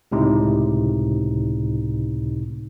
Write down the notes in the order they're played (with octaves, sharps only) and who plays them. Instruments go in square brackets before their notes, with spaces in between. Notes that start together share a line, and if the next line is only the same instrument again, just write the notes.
[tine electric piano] C#2 A2 C3 D#4